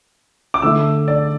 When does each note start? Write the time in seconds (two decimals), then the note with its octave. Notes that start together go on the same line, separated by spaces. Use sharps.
0.54 D6
0.62 D3 A3 E4 E6
1.08 D5